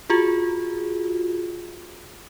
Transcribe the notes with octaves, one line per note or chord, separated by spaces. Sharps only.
F4 F#4 G#4